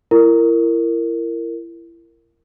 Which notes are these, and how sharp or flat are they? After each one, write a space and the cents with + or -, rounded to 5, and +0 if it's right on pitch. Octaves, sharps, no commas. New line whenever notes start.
E4 +30 A#4 -20